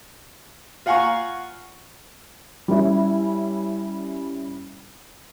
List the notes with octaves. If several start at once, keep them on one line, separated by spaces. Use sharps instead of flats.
F4 F5 F#5 G#5 A#5 C#6
G3 C#4 E4